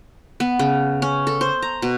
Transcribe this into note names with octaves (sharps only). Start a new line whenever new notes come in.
B3
C#3
C#4
A4
C5
A#5
B2